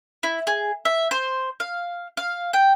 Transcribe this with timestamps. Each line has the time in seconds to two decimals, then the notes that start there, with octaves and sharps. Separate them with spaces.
0.23 E4
0.47 G#4
0.85 E5
1.11 C5
1.60 F5
2.17 F5
2.53 G5